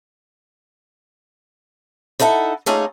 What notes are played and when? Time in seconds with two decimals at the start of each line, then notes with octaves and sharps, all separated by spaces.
2.20 D#4 E4 A4 E5 F#5
2.66 A3 A#3 C#4 D#4 F4 G#4